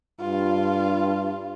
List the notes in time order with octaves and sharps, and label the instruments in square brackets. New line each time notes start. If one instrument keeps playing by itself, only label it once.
[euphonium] G2 [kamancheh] F4